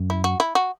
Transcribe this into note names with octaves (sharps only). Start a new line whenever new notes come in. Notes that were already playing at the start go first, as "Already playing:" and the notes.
Already playing: F#2
E4
F#4
E4
F#4